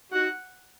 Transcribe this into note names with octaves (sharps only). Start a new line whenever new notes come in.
D#4 F#4 F#5